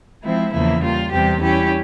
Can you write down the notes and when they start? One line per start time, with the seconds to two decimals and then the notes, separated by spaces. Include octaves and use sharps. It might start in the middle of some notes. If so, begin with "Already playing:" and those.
0.23 F3 G#3 C4 E4
0.53 E2 C#3 F3 A#3 E4
0.82 G3 A#3 F4
1.12 E2 C3 G3 C4 G4
1.41 G3 C#4 E4 G4